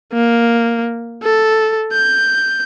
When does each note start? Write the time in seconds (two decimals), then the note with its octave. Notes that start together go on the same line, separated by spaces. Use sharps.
0.13 A#3
1.23 A4
1.92 G6